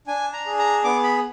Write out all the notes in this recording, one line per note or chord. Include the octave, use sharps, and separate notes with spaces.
D4 G#5
A#5
G#4
A#5
B3 D6
B5